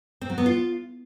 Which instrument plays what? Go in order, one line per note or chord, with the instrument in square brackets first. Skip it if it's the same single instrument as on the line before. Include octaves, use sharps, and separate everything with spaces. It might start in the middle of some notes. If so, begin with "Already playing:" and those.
[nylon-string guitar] C4
F#3
B3
F4